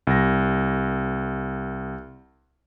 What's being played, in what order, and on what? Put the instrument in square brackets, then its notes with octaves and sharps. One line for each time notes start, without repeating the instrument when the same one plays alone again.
[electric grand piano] C2 A#6